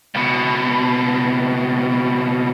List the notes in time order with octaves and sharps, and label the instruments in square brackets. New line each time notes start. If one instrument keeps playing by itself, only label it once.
[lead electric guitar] C#2 B2